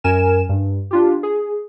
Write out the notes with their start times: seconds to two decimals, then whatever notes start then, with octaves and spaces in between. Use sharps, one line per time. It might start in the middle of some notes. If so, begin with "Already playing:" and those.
0.04 F#2 A#4 G#5 E7
0.49 G2
0.91 D4 F4 G4
1.23 G#4